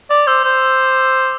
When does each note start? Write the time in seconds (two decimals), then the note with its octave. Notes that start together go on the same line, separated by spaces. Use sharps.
0.10 D5 D6
0.27 C5 E6
0.45 C5